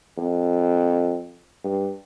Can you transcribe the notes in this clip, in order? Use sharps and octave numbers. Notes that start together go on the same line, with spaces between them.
F2
G2